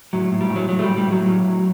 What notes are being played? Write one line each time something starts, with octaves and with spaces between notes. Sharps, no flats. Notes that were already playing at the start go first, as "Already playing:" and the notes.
A2 F#3
A2
G3
A2
F#3
A2 F#3
A3
A2 G3
G3
A2
F#3
A2
A2